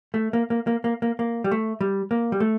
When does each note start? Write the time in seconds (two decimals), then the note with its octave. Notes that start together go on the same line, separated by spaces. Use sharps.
0.14 A3
0.33 A#3
0.50 A#3
0.67 A#3
0.84 A#3
1.02 A#3
1.19 A#3
1.44 G3
1.52 A3
1.81 G3
2.11 A#3
2.32 G3
2.40 A3